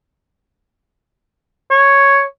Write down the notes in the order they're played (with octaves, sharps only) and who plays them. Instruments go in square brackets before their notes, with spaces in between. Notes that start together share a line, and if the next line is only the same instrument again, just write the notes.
[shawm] C#5